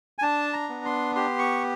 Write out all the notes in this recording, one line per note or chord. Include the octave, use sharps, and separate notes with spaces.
G#5
D4 A5
A#5
B3
C6
G4 C6
C#6